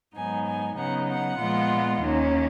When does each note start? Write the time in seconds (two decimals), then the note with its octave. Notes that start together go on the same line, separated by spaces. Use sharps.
0.16 G#2 F#3 B3 D#4 G#5
0.47 G#5
0.77 C#3 F#3 B3 D#4 F#5
1.08 F#5
1.39 A#2 F3 G#3 B3 F4
2.01 D#2 D#3 A#3 C#4